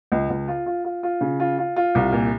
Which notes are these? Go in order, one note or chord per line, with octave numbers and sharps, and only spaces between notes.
C#2
C#2
F4
F4
F4
F4
C#3
F4
F4
F4
C2
A#2